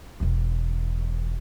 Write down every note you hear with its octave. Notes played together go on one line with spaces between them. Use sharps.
E1 E2